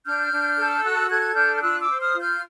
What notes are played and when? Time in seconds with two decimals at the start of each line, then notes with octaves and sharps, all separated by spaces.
0.06 D4 F6 G6
0.32 D4
0.58 A4
0.83 F#4 E6 F#6
1.09 A4 F#6 G#6
1.35 D4 F6 G6
1.56 G6
1.61 F4 E6 F#6
1.81 D6 E6
1.88 C5
2.00 D#6 F6
2.14 F4
2.20 F6 G6